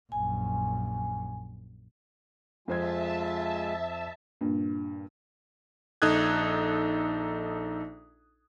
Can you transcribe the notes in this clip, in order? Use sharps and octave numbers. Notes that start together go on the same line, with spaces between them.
A#1 F#2 G#5
F2 G#3 F4 C5 E5 G#5 A5 G#6
G2 A#2
A#1 D#4 A4 D#6 F#6 G#6